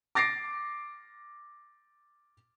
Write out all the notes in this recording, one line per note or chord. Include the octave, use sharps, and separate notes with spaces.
D6 A6 A#6 C7 D7